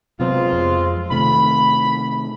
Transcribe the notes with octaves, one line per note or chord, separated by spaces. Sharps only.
C3 F#3 G#3 B3 C4 F4
F2
C3 D#3 A3 B5